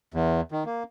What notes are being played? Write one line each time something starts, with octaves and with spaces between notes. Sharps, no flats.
E2
D#3
A#3